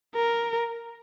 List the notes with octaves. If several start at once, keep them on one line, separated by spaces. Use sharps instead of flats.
A#4